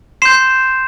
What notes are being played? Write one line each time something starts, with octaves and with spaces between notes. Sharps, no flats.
C6 G6 C7 E7